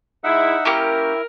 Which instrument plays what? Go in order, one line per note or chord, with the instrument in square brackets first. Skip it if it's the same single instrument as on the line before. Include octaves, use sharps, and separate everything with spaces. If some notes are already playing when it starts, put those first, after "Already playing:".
[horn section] G#3 E4 [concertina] D#4 E5 F#5
[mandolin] A#3 C#4 G4 [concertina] E4 [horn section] A#4